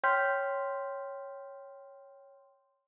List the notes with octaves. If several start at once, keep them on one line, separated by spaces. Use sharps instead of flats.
C#5 G5 C6 F6 G6 B6